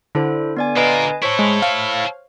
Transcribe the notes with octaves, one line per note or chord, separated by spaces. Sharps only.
D3 E4 A4 C5
B3 D5 G#5
F4 A#4 B4 D#5 G#5
E4 A4 C5 C#5 C#6
G#3
F5